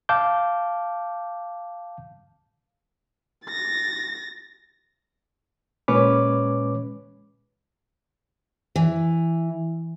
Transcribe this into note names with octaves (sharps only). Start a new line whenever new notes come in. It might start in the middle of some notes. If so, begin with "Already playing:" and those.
F5 A5 D6 G6
A6 A#6
A#2 G#3 C#4 B4 C#5 D6
E3